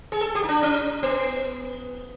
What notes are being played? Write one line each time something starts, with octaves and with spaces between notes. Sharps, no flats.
G#4
A4
G4
D#4
D4
C#4
B3